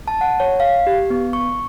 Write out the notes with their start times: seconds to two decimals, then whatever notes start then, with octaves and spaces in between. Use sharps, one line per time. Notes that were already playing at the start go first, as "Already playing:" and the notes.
0.08 A5
0.21 F#5
0.40 C#5
0.60 F5
0.87 G4
1.10 B3
1.33 C#6